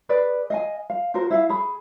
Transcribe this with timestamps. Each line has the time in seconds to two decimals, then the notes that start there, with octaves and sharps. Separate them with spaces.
0.09 G#4 B4 D5
0.50 D#5 F5 G#5
0.90 F5
1.14 F4 F#4 A#4 C5
1.30 E4 E5 F5
1.49 G#4 B5